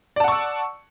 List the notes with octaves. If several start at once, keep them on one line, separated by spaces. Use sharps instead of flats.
D5 F#5 A5 C#6 E6